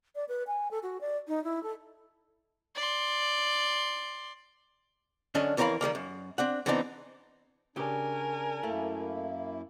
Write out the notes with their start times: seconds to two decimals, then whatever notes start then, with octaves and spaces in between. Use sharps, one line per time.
0.15 D5
0.28 B4
0.47 G#5
0.71 A4
0.83 F#4
1.01 D5
1.28 D#4
1.44 E4
1.63 A4
2.76 D5 C6
5.35 F#2 D3 C#4 D4 D#5
5.57 F2 E3 A#4 C#5 F5 B5
5.81 D#3 G3 G#3 A#3
5.95 F#2
6.38 C4 D4 F#5
6.66 E3 B3 C4 D4 D#4
7.76 C#3 D4 G4 A#4 G#5
8.63 F#2 A3 A#3 E4